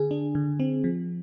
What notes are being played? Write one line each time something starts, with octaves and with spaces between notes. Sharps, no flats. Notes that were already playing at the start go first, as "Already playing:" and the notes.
Already playing: D3 G#4
D4
D3
C4
F3